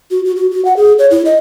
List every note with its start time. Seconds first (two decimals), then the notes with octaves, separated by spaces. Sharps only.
0.11 F#4
0.25 F#4
0.36 F#4
0.51 F#4
0.65 F#5
0.77 G#4
0.99 C#5
1.11 E4
1.25 D#5